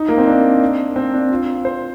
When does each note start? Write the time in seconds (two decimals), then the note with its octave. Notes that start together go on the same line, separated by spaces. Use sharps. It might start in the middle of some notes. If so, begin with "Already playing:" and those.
Already playing: D#4
0.08 A#3
0.18 C4
0.27 D4
0.96 C4
1.13 D4
1.31 F4
1.65 C5